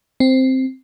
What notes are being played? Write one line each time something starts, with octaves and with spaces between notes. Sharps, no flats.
C4